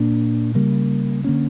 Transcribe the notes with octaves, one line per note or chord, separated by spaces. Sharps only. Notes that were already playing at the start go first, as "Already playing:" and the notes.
Already playing: A#2 A#3 D4
C#3 G3 A#3
D3 A#3 C#4